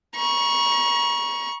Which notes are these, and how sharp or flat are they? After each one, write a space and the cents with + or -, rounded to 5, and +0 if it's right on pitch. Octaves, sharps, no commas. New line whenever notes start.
A#5 +40 C#6 +0